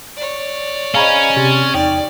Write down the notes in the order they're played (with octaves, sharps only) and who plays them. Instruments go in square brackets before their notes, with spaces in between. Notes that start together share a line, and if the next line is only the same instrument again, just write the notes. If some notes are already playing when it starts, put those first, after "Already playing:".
[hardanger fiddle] C#5 D5
[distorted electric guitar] C#4 [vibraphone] G#4 C5 D#5 [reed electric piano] F5 A#5 B5
[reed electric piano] C3 G4 A6 [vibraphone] C4
[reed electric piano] E2 G5 [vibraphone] D#4 [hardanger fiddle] D5